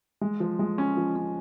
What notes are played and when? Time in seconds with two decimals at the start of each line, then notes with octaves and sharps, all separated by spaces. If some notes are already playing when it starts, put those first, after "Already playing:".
0.21 G#3
0.40 F3
0.59 G#3
0.78 C#4
0.97 F3
1.16 C#4